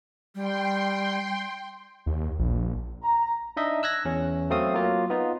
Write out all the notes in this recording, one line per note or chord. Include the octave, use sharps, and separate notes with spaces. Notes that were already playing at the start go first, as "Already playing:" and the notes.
G3 G5 C6
D#2
A#1
A#5
D4 D#4 D#5 E5
E6 F#6 G#6 A#6
E2 C#4
F#3 A3 C4 F5 D#6
F#3 A#3 F4
B3 D#4 F4